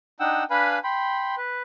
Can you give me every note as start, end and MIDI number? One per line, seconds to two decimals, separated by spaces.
0.20 0.44 62
0.20 0.44 63
0.20 0.44 78
0.20 0.44 79
0.20 0.44 88
0.50 0.79 62
0.50 0.79 71
0.50 0.79 77
0.50 0.79 80
0.50 0.79 83
0.84 1.35 79
0.84 1.35 83
0.84 1.35 84
1.37 1.62 71